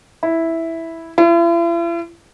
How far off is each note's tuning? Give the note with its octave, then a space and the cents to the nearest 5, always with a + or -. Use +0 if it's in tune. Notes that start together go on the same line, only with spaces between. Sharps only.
E4 -5
E4 +45